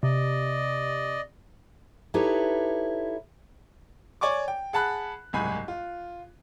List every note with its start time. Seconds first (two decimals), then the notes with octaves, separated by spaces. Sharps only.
0.03 C3 D5 D#5
2.14 D#4 E4 G4 A4 B4 C#5
4.21 C#5 D5 G#5 C#6 D6
4.48 G5
4.73 G#4 F#5 A5 B5 F#6
5.33 F#1 C2 G#2 G#5 B5
5.68 F4